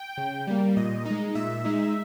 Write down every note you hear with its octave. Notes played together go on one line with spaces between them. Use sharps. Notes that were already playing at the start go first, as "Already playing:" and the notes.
Already playing: G5
C#3
G3 A#3
A#2 D#5
D#4
G#3
A#2 E5
G#3 D#4